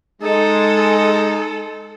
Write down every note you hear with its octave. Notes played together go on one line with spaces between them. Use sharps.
G#3 D#4 A4